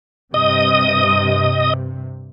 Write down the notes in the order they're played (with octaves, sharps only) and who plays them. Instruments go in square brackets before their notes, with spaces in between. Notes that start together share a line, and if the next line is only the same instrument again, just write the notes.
[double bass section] G2 C3 [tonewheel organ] D#5 D#6